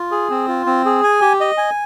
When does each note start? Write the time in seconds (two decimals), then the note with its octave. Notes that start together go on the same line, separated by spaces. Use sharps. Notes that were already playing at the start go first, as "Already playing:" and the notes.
Already playing: F4
0.11 G#4
0.30 C4
0.48 F4
0.66 C4
0.86 G#4
1.03 G#5
1.21 G4
1.40 D#5
1.58 G#5